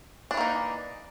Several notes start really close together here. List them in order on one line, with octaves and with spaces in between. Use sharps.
D4 E3 A#3 D#4